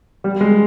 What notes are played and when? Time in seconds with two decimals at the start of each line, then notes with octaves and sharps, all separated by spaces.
0.24 G3
0.41 G#3